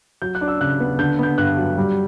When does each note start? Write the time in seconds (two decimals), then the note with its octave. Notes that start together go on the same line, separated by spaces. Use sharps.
0.22 F#3 G6
0.35 F#6
0.41 D4
0.48 E6
0.61 C#3 F#6
0.80 B3
0.99 D3 G6
1.19 B3 G6
1.38 G2 F#6
1.57 F#3
1.78 G3